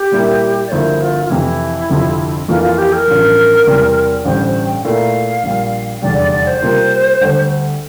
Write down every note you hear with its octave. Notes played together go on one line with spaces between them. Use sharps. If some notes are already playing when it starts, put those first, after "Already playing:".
Already playing: G4
A#2 G3 A#3 E4
D5
G1 G2 F3 A#3 E4 C5
F4
F4
F2 C3 E3 E4
G1 F2 C3 F3 C4
F2 E3 A#3 F4
F4
G4
A#4
A1 G2 F3
E2 C3 E3 G3 C4
A1 G2 D3 G3 D4 C5
C5
G5
A#2 A3 E4 A#4 F5
A#1 A#2 G3
F1 E2 D3 G3 D5
D5
D5
C5
C3 G3 A#3 F4 A#4
D2 D3 G3